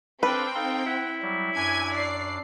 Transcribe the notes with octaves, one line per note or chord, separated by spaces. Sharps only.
C4 D4 A4 B4 F5 G5
D#4 A4 F5
E4 F#5
F#3 G3
F#2 D4 G#5 G#6
D5 C7